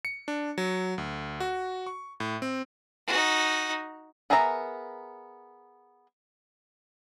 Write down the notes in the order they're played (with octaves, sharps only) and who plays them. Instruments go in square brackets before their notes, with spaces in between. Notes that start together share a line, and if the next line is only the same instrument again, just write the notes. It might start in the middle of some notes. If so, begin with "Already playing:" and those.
[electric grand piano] C#7
D4
F#3
D2
F#4
C#6
A2
C4
[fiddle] D#4 F#4
[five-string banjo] B3 G#4 A#4 E5 A#5